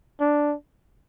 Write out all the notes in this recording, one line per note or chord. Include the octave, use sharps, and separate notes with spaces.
D4